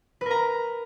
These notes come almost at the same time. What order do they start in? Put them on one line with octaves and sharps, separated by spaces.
B4 A#4 A#5